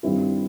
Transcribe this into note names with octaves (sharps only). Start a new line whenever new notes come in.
G2 D#3 G3 C4 E4